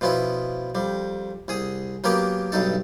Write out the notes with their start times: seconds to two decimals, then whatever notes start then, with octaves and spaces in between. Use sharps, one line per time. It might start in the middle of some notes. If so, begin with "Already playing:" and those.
0.01 B2 F3 B3 C#4 E4
0.75 F2 G3
1.48 C2 G#4 D#6
2.04 F#3 A#3 B3 C#4 G4 A#4
2.52 B1 G2 D#4 A4